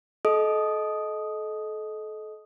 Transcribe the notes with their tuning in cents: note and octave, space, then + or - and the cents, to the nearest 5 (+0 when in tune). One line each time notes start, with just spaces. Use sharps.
A4 -30 D#5 +5 D#6 +0